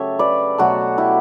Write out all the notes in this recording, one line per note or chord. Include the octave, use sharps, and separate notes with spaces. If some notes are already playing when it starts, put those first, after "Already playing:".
Already playing: C#3 F#3 A3 G4 A4 C#5 E5
B4 D5
B2 F#3 A3 F#4 A4
E4 G4